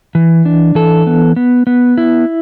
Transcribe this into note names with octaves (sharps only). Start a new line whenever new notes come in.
E3
D4
E3 A4
B3
B3
B3
E4